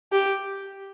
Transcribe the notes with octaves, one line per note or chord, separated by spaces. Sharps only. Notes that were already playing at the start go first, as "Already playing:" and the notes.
G4